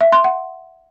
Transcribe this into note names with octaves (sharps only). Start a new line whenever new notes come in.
E5
C6
F#5